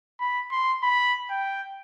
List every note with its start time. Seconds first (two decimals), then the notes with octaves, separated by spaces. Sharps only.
0.20 B5
0.52 C6
0.83 B5
1.30 G5